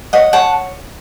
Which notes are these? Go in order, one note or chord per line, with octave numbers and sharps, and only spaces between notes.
C#5 D#5 F#5
C#5 F#5 A5